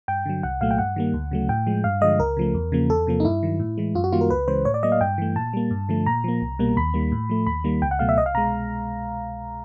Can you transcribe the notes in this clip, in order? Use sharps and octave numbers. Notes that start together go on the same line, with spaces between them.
G2 G5
D3 F#3
C2 F#5
A#2 F#3 A3 F5
G5
G2 F#5
D#3 G3 A#3
D2
C#3 F#3 A3
A2 G5
F3 G#3
G2 F5
D3 F3 G#3 D#5
C#2 A#4
C#3 F3 A3
E2
C#3 F3 A#3
E2 A4
C3 F3 A#3
D#4
G2 E4
D#3 F#3
A2
E3 G#3
F#2 F4
F#4
D#3 G3 A#3 F4
A#4
C#2 B4
C#3 E3 G#3 C5
A2 C#5
D5
F#3 A#3 D#5
F5
G2 G5
E3 A3
A#2 A5
G3 A#3
G2
D3 F3 A3
A#2 A#5
F3 A#3
C2
B2 G3 A#3
D#2 B5
D#3 G3 A#3
A2
F3 A3
D#2 B5
D#3 G3 A#3
C#2 G5
F#5
B2 F#3 A3 F5
E5
C2 D#5
F5
B2 G#3 A#5